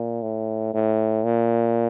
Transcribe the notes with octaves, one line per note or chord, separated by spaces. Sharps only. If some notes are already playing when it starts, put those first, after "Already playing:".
Already playing: A#2
A2
A2
A#2